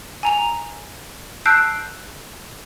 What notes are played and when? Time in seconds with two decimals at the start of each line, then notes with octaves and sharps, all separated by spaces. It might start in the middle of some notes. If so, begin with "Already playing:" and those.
0.23 G#5 A#5 F7
1.46 A5 E6 F#6 G6 C7 D7